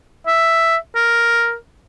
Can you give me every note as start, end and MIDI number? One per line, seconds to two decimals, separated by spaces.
0.27 0.76 76
0.95 1.55 70